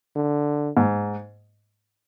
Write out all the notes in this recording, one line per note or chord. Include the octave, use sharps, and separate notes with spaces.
D3
G#2